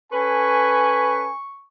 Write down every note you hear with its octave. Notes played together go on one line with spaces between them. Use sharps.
C#4 A4 B4 G#5 C#6